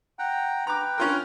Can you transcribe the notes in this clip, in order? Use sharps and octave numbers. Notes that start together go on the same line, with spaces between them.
F#5 G5 A#5
B4 G5 A#5 D6
C#4 F4 A#4